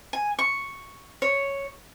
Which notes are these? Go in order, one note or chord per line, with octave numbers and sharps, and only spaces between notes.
G#5
C#6
C#5